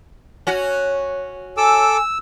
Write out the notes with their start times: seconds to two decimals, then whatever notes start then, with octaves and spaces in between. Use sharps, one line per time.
0.47 C#4 F#4
1.57 A4 G#5 D6 E6